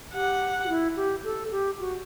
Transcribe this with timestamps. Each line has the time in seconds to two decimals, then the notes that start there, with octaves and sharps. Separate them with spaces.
0.13 G4 F#5
0.64 F#4
0.69 E4
0.96 G4
1.24 A4
1.51 G4
1.80 F#4